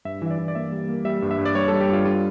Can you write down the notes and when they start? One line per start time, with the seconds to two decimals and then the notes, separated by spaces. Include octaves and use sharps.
0.05 G2 E5
0.22 E3 E5
0.31 D5
0.39 E3
0.48 D5
0.55 A#3 E5
0.72 G3
0.89 A#3
1.05 G3 E5
1.22 G2
1.31 E5
1.39 G2
1.45 D5
1.55 G3 C#5
1.68 G3 A4
1.81 G4
1.89 G2 F4
2.05 G3 F4